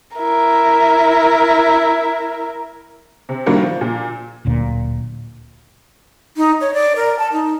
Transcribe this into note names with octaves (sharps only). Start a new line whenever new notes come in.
E4 A#4
C3
A2 D#3 G3 A#3 D4 F#4
F3
A#2
D1 D2 A#2
D#4
C#5
D5
A#4
A5
D#4